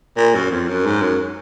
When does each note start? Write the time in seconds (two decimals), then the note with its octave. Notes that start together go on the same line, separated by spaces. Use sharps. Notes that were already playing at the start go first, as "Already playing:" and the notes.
0.17 A#2
0.35 F#2
0.51 F2
0.68 F#2
0.86 G#2
1.02 F#2